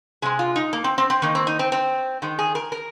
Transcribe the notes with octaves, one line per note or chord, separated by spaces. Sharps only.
C3 G#3 G#4
F4
D#4
A#3
C4
C4
C4
D#3 A#3 D#4
C4
D#4
C4
C4
D#3 G#3
G#4
A#4
A#4